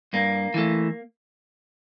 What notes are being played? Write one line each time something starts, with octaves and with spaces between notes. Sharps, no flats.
G2 A#3
E3 A3